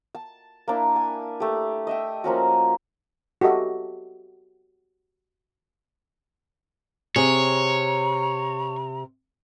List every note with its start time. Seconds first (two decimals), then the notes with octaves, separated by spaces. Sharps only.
0.15 A5
0.68 A#3 D4 E4
0.96 G#5
1.40 A3 G4
1.87 D#5 E5 G5
2.24 F3 A#3 C#4 F#4
3.41 F#4 G4 A4 D#5 E5
7.16 C3 G#4 C#5 A#5